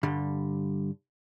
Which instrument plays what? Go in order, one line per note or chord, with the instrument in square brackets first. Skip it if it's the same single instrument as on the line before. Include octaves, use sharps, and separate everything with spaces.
[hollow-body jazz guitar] G2 D3 G3